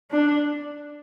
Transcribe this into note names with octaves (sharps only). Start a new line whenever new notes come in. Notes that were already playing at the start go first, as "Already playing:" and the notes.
D4